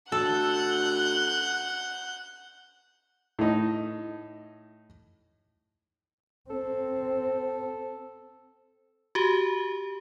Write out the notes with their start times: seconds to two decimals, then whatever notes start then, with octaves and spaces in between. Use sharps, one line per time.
0.12 D2 A4 F#5 F#6 G6
3.39 A2 D#4
6.50 C4 A4
9.15 F#4 G4